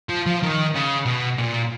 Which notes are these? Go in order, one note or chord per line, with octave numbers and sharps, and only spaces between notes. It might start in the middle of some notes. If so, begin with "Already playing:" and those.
F3
F3
D#3
C#3
B2
A#2